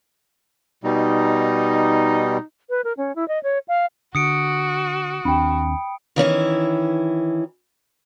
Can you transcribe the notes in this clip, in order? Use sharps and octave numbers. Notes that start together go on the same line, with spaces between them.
B2 G3 D#4
B4
A#4
C#4
E4
D#5
C#5
F5
D3 F#4 D#6 C#7 D7
D#2 C4 D4 G5 B5
D#3 E3 C#4 E4